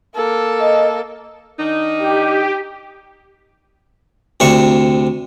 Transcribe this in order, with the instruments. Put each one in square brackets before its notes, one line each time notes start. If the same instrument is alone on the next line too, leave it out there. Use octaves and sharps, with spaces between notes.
[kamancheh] A#3 A4
[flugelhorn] D#5
[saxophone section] D#3 D4 D#4
[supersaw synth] G4
[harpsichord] D2 C3 D4 C#6